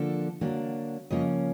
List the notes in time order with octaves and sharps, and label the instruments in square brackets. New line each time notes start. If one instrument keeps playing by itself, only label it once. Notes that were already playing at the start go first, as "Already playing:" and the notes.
Already playing: [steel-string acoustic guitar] D3 F3 A#3 D4 A4
D3 F#3 A#3 D4
C#3 F3 A#3 C#4 D#5